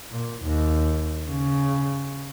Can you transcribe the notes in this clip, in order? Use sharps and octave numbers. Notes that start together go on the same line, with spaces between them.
A#2
D#2
C#3